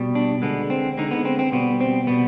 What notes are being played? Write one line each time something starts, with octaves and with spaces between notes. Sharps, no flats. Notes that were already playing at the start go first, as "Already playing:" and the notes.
Already playing: B2 G3
D4
D3 G#3 B3
C4
D3 G#3 D#4
B3
C4
C4
B2 G3 B3
C4
B2 G3 B3